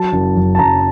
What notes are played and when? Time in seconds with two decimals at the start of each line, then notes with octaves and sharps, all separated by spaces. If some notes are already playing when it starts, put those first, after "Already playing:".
Already playing: F#3 A5
0.12 F#1
0.37 F#1
0.55 A5
0.59 F#1 A#5